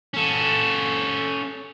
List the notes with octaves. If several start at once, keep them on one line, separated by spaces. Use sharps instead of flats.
C#4 A4